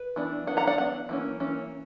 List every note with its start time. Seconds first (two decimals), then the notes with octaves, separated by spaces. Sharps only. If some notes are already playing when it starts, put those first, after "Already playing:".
Already playing: B4
0.16 E3 B3 D4
0.47 E3 B3 D4 F#5
0.57 F#5 A#5
0.67 D5 F#5
0.78 E3 B3 D4 F#5
1.09 E3 A#3 C#4
1.40 E3 A#3 C#4